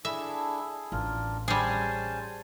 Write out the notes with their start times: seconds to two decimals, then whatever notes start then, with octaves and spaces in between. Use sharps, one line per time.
0.05 D4 E4 G#4 A4 E5
0.92 A1 D4 F4 A#4
1.48 G3 C#4 G#4 C5 G#5 A5